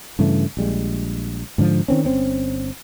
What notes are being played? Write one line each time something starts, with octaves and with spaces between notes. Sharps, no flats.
G2 C#3 E3 A3
A#1 G3 G#3
G#2 D3 E3 F3
D#3 C4 C#4
G1 C4 C#4